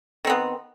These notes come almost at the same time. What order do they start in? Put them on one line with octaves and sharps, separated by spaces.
D#3 C4 B3